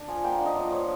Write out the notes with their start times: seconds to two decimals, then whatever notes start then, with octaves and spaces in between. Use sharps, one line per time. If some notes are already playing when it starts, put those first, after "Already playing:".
Already playing: D4
0.08 F3 G#5
0.24 A#3 G5
0.35 F#5
0.40 D4
0.46 D#5
0.56 F3 D5
0.72 F3 C#5